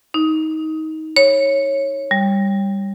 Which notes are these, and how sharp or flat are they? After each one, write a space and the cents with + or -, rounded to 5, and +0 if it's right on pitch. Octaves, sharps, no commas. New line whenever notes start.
D#4 +20
C#5 -10
G3 +15